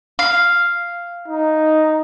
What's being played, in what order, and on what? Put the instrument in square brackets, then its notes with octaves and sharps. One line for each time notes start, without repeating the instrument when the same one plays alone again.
[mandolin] F5
[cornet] D#4